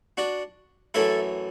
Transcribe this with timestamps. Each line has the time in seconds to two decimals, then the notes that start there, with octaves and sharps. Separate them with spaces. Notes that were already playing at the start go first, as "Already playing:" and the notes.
0.17 D4 F#4
0.94 F#2 E3 A3 E4 A4